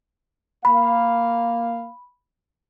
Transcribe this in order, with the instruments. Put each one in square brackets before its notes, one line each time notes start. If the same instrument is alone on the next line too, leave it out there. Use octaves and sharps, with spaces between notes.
[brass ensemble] A#3 F5 [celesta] B5